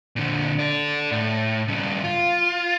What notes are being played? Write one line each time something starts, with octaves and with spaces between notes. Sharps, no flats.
A#2 D3
A4 D5
A2
G2 C#3
F4